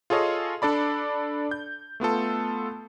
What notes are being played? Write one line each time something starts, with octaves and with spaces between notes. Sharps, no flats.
F4 G#4 A4 C#5 D#5 F5
D4 A4 D5 B5
G6
A3 B3 F4 A4